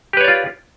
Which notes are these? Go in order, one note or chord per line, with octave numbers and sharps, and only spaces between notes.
F4 G4 B4 C#5 D5